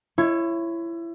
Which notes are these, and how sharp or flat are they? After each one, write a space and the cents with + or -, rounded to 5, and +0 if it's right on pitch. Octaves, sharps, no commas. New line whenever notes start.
E4 +25 C#5 -15